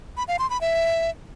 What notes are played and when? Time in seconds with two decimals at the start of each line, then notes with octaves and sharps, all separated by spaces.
0.17 B5
0.28 F5
0.39 C6
0.50 B5
0.61 E5